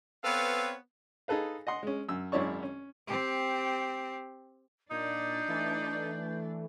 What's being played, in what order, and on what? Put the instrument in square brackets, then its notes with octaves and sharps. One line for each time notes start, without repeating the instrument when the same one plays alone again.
[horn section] B3 C4 A4 B4 C#5 F5
[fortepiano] D#4 G#4 A4 B4 F5
D#5 F#5 C6
G#3 C#4
F#2 E6
G#1 F#2 E4 C#5 D5 C#6
C#4
[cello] C4 G4
[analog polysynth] A#2 [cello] D4 D5 [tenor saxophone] D#4 [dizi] G6
[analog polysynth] E3 A3